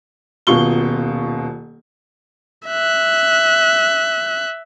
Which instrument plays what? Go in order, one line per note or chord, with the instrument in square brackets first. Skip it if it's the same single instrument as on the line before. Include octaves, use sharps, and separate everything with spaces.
[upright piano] D#1 B2 F4 C#6 G7
[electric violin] E5 F#6